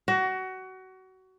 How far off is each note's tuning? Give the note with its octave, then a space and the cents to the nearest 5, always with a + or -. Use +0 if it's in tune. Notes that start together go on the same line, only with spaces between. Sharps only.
F#4 +25